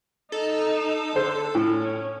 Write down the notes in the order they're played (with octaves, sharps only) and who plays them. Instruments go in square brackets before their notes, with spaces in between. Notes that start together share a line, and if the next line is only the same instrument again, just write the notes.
[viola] D#4 [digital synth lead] A4
[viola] D3 [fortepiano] C5
[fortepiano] A2 [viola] C#4